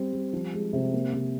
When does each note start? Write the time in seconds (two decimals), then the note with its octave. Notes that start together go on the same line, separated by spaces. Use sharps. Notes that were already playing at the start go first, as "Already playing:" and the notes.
Already playing: G3 C4
0.13 G3
0.33 F3
0.53 G#3
0.73 C3
0.93 A#3
1.13 C3